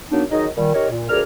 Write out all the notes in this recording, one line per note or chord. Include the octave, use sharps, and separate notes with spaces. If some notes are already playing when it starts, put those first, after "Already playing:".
F#3 A#3 B3 D4 D#4
D#3 F#3 D#4 G#4 D#5
A#2 D#3 G3
D#4 G4 A#4 C#5
A#2
D2 F3 G#4 A#4 D5 F6